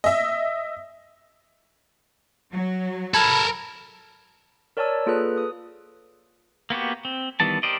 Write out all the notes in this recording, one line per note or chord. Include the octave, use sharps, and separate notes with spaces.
D#5 E5
F#3
A4 A#4 A5 B5 G#6
A#4 C#5 D5 G#5 A5 E6
A#3 F4 G#4 A4 B4 F#6
D#6
A#3 B3 F#4 G4
C4
D#3 E3 G3 B3 A5
G4 A#4 C5 D5 D#5